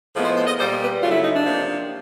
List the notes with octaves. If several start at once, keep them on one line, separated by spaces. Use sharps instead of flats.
A2 F3 G#3 B3
C5
C5
D#5
A#2 G3 A#3 C5
B4
C#3 F#3 A3 F4
E4
D#4
D4
C3 F3 A#3